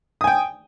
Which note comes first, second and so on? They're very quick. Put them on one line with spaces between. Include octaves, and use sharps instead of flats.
D#6 G#5 G5